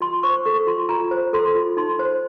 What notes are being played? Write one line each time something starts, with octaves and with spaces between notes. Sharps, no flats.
F4 C6
C5 C#6
A4 C#6
F4 C6
F4 A#5
C5
A4 C6
F4
D#4 C6
C5